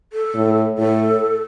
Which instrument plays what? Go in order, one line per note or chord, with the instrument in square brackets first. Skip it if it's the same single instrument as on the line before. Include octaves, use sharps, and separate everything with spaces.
[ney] A4
[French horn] A2
[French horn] A2 [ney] A4